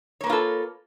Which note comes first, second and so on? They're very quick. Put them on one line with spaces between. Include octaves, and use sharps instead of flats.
C#5 A#3 B4 F4 A4